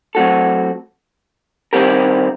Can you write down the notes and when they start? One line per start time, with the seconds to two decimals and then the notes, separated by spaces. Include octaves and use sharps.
0.15 F#3 A3 C4 F#4 A4
1.73 D#3 G3 C4 G4 A#4